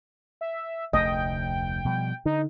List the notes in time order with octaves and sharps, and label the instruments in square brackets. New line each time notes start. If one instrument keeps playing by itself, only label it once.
[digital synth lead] E5
[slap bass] F1 D2 A3 [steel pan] D#5 [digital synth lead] G5
[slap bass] B2 F3 G3
[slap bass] D3 [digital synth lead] D#4